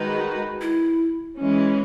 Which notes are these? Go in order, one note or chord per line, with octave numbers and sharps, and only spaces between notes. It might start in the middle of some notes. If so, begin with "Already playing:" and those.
Already playing: D#3 G#3 D#4 F#4 B4
E4
E3 G#3 C#4